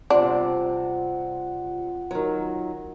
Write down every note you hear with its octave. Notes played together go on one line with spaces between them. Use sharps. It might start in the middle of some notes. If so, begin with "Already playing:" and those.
C3 G3 C4 D4 F4 F#5
D#3 F#3